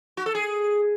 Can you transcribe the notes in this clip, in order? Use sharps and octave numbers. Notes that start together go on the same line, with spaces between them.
F#4
A4
G#4